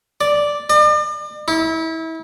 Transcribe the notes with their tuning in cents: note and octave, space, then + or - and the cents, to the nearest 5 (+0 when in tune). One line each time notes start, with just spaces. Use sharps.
D5 +0
D5 +45
E4 -30